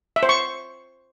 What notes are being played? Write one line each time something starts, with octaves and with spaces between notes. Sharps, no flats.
E5
C5
C#6